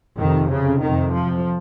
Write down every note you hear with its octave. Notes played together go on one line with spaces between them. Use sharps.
F2 C3 D#3
C#3
F2 C3 D#3
F3